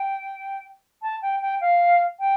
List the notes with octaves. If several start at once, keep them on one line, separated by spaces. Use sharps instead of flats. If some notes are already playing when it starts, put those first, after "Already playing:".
Already playing: G5
A5
G5
G5
F5
G5